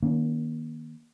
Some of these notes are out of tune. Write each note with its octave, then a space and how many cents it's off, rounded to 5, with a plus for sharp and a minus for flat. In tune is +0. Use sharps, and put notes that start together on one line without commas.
D#3 +0 A#3 +30 C#4 +25